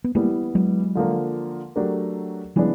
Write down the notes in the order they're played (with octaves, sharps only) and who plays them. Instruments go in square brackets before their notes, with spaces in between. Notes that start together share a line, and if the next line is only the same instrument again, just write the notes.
[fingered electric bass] B3
[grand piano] E3 G3 B3 E4 [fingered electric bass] G#3 A#3
[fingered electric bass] F#3 G#3
[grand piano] D3 F3 A#3
F#3 A3 D4 G4 A#4
[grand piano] C#3 E3 G#3 B3 D4 [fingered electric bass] F3 G3